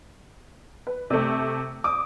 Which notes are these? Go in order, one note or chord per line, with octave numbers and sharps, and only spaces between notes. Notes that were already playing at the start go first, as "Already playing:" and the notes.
B4
C3 A3
D6 D#6